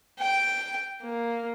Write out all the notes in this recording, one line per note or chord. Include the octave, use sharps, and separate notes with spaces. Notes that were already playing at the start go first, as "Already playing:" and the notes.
G5
A#3